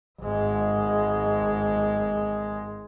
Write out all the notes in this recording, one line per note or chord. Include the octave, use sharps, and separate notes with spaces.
G#1 G#3